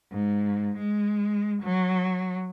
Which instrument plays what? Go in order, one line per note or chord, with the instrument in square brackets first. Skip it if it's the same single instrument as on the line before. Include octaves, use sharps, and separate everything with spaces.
[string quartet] G#2
G#3
F#3